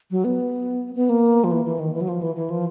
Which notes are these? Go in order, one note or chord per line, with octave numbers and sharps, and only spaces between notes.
F#3
B3
B3
A#3
F3
E3
E3
D#3
E3
F#3
F3
E3
E3
F3